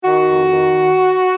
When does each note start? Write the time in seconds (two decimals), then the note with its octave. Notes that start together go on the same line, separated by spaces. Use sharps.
0.04 D#3 F#4
0.28 F2
0.51 D#3